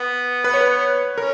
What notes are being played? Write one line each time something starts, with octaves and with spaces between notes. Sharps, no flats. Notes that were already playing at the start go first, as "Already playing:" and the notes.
Already playing: B3
B4
C#5
B4
C#4 A#4